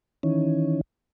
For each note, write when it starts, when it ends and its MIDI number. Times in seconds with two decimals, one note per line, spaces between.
0.23 0.81 51
0.23 0.81 52
0.23 0.81 61